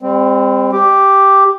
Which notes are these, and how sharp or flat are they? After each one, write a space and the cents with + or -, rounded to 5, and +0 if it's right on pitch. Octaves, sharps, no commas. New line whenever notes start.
G3 +40 C4 +0
G4 +0 D6 +0